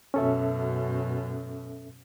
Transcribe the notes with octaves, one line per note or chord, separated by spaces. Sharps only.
F#2 B2 C#4 A4 E5